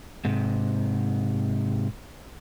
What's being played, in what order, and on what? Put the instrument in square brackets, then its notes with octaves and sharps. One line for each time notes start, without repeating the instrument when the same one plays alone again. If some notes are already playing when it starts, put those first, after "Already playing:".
[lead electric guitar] G#2 C3